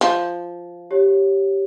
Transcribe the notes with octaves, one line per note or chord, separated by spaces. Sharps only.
F3
G4 C#5